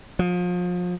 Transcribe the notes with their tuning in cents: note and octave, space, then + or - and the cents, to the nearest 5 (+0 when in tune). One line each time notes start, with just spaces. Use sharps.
F3 +35